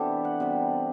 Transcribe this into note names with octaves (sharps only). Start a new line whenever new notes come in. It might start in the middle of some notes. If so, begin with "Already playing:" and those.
Already playing: C3 E3 B3 D4 G4 A4
F#5
C3 G3 B3